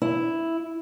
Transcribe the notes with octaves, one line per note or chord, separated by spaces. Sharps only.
E4